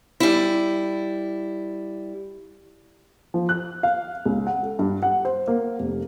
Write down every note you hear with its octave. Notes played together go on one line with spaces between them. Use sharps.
G3 E4
F3
F#6
F5
C#2
F#5
A4
G2
F#5
C5
A#3
F1